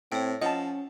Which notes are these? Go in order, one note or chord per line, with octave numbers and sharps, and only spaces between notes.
A2 C4 C#5 G5
F3 C#4 D#5 F#5 A5